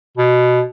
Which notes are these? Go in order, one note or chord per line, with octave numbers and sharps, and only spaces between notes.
B2